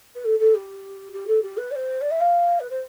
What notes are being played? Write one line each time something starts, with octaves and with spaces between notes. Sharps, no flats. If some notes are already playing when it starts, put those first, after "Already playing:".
B4
A4
A4
G4
G4
A4
G4
B4
D5
C5
D5
E5
F5
B4
C5